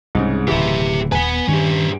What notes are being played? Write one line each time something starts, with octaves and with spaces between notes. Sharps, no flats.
C2 G#2 C#3
D1 C#3 E3 G4 E5
D#1 B4 F#5 G#5
G2 D#3 C#4 G4